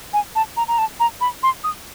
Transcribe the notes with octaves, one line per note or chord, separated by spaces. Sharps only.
G#5
A5
A#5
A#5
A5
A#5
B5
C6
D#6